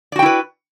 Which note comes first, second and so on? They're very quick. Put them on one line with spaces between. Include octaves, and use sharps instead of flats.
D5 F#4 G5 E4 B4